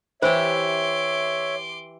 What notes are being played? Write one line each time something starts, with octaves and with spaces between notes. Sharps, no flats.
E3 G4 C5 C#5 E5 C6 D6